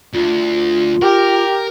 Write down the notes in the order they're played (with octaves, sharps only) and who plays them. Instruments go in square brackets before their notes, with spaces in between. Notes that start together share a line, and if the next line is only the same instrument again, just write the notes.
[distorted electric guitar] D2 [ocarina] F4
[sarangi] G4 [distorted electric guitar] A#4